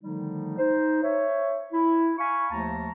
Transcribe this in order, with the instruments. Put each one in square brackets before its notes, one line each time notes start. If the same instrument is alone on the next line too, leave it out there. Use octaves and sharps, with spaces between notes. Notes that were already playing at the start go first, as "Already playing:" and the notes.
[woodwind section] D3 D#3 F3 G3 A3 D#4
D#4 C5
C#5 E5
E4
F5 G#5 B5 C#6
D#2 F3 A3 A#3 A5 A#5